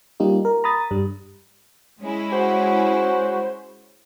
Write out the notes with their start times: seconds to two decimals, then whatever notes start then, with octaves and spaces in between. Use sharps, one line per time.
0.20 G3 A#3 D#4 F4 G4
0.45 A#4
0.64 A#5 B5 D#6 A6
0.91 G2 G3
2.01 G#3 C#4 E4
2.33 F#4 C5